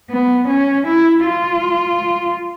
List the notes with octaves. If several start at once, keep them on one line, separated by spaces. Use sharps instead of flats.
B3
C#4
E4
F4